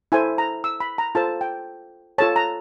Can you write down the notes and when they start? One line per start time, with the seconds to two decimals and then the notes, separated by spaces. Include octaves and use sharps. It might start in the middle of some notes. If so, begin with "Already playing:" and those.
0.12 E4 A4 C5 G#5
0.38 A#5
0.64 E6
0.80 B5
0.98 A#5
1.15 F4 A4 C5 A5
1.41 G5
2.18 F4 A4 C#5 A5
2.36 A#5